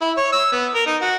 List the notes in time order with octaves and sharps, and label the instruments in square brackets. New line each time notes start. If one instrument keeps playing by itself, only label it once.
[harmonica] E4
C#5
E6
B3
A#4
D#4
F#4